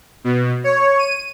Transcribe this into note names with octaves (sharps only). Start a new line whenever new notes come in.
B2
C#5
D#7